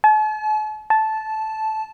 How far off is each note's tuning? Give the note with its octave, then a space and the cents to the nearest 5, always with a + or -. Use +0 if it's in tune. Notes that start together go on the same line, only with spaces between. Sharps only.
A5 -45
A5 -10